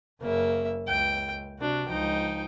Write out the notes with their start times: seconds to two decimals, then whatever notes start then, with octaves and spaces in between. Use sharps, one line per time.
0.21 F#1 C#3 A#3 E5
0.87 C#2 G5
1.59 C3 D4 F#4
1.88 C#2 F3 D#4 G5